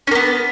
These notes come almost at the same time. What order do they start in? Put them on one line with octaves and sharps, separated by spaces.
C#4 A#3 B3